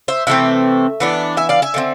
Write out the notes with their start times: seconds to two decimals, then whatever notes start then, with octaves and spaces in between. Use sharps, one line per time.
0.08 C5 E5
0.27 C3 E3 A3 C4 E5
1.00 E3 B3 D4
1.37 E5 G#5
1.49 D5 F5
1.62 E5 G#5
1.74 D3 A3 C4